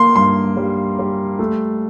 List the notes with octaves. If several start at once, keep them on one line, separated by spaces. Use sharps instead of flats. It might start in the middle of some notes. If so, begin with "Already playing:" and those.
Already playing: A#3 C6
G2 C6
G3
G3
A3